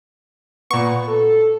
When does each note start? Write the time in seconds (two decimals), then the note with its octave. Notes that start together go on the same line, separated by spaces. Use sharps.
0.71 A#2 B3 C#6
1.08 A4